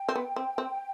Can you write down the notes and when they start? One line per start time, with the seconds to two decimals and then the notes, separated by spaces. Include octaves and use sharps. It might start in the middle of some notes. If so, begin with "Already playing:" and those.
Already playing: G5
0.09 C4
0.15 B3
0.36 C4
0.58 C4